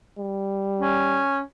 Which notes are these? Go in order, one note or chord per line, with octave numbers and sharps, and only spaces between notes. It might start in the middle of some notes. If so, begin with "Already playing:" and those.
G3
C#4